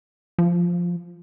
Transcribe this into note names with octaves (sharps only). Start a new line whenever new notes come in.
F3